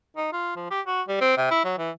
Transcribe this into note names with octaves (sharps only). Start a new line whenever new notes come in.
D#4
F4
F3
G4
F#4
G3
C4
C3
E4
F#3
E3